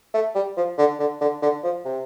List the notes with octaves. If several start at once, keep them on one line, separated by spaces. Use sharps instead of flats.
A3
G3
F3
D3
D3
D3
D3
F3
C3